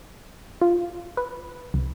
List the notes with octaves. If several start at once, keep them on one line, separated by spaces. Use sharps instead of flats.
F4
B4
C2